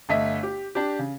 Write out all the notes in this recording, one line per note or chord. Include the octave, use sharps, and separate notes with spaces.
G1 A3 D#5 E5 B6
G4
D4 G4
C#3